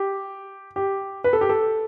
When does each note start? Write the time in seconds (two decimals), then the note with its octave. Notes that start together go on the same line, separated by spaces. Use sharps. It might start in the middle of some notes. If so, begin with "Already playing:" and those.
Already playing: G4
0.76 G4
1.24 B4
1.33 A4
1.41 G4
1.49 A4